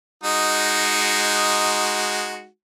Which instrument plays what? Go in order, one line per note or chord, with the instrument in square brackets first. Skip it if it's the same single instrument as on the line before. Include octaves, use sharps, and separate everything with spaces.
[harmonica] G#3 D#4 F#4